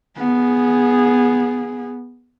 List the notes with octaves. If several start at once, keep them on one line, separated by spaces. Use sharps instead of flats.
B3 G#4